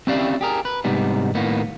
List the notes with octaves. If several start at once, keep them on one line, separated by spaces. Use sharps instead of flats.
C4 C#4 E4 G4 D5 F5
G4 G#4 A#4
B4
G#2 C3 G3 B3 D#4
A2 D#3 A#3 B3